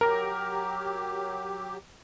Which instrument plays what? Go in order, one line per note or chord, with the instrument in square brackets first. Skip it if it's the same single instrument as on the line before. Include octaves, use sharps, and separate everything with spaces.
[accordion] F#3 G4 [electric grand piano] A#4 A#6